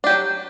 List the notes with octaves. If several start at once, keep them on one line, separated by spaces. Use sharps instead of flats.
F#3 D4 G4